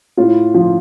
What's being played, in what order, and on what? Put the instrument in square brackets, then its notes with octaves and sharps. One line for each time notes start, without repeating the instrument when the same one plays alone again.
[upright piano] A2 F4
F3